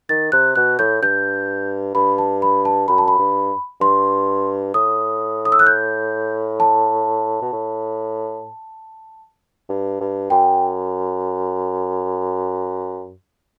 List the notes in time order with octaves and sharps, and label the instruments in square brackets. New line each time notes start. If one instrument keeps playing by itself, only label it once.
[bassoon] D#3 [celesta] A6
[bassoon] C3 [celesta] F#6
[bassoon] B2 [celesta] F#6
[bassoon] A2 [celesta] G6
[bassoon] G2 [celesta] G6
[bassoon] G2 [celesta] B5
[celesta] A5
B5
A5
[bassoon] F#2 [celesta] B5
[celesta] A5
B5
[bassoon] G2
[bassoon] G2 [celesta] C6
[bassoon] A2 [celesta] D#6
[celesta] D#6
E6
F#6
G6
A5
[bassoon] B2
A2
G2
G2
[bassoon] F#2 [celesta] G5